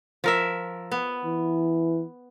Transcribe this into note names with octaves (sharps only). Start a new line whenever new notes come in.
F3 A#4 E5
B3
E3